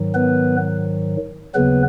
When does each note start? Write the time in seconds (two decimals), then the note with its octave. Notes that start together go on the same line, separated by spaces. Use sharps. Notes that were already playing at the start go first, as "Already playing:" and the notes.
Already playing: G#2 D#3 F#3
0.14 B3 B4
1.54 D#2 C#3 F#3 B3 B4